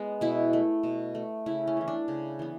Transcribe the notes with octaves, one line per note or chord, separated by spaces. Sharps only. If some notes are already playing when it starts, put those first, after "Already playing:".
Already playing: G#3 B3
B2 E4
A3
B2
A3
C#3 E4
C#4
E3 B3
D4
C#3
E3 B3